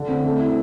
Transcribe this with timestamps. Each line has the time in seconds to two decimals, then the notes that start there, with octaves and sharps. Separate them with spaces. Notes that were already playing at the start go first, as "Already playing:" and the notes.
Already playing: D3
0.08 C4
0.24 A3
0.39 E4